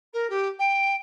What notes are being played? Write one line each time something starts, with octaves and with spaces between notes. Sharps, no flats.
A#4
G4
G5